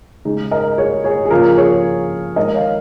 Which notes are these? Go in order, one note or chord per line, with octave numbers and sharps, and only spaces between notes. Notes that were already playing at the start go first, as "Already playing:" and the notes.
C#3 G#3 D#4 G#4
A#4 D#5
G#4 C#5
G#4 C#5
G#4
C#3 F3 A#3 F4 A#4
G#4 C#5
D#3 G#3 A#4 D#5
C#5 F5